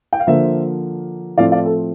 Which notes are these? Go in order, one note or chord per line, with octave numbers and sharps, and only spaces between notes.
G5
F5
D3 F3 A#3 C5 E5
A2 F3 A3 C4 D5 F5
D5 F5
A4